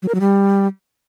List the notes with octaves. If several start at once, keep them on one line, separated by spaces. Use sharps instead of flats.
F#3
A#4
F#3
G3